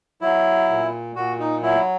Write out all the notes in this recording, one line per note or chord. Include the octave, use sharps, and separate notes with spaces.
F#3 E4
A#2
A#2 F#4
D#4
F#3 E4